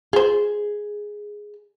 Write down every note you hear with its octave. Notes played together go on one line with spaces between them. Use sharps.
F4 G#4 C5